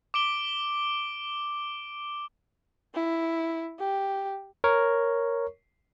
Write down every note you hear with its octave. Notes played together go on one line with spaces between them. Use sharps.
D6 D7 G7
E4
G4
A#4 C#5 C#6